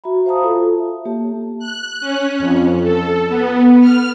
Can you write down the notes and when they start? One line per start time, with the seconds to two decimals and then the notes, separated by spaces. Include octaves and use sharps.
0.04 F#4 E5 A#5 B5
0.26 C5 F5 A5 A#5 D#6
0.43 F4 A4
0.80 E5
1.05 A#3 G4 C#5 A5
1.59 F#6
2.01 C#4
2.39 F2
2.83 A4
3.29 B3
3.81 F6